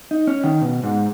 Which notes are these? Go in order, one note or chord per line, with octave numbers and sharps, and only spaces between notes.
D#4
C#4
D#3
B2
G#2